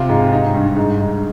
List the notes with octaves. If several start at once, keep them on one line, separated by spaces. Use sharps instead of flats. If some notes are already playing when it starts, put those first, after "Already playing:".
Already playing: C3 F4
G#2
D#4
G2
G#2
G#2